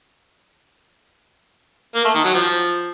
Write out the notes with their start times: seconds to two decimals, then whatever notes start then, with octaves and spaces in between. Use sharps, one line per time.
1.95 A#3
2.05 A3
2.14 D#3
2.24 F#3
2.34 F3